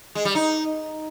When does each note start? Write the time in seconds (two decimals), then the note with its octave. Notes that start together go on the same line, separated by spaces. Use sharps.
0.15 G#3
0.25 G3
0.35 D#4